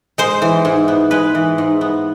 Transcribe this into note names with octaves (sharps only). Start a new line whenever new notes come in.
G#3 C5
E3
G#2
B3
G#3 B4
E3
G#2
B3